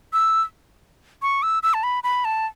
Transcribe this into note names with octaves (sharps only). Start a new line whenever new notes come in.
E6
C#6
E6
E6
A5
B5
B5
A5